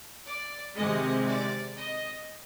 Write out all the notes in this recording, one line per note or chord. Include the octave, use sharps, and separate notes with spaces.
D5
C3 D#3 G#3 D#5
D5
D#5